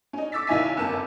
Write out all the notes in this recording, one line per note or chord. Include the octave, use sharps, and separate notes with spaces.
C#4 D#4
C#6 D6 E6 A6 B6
B1 D#3 D#4 E4 G#5 B6
G1 F#2 C3 A#3 A5 E7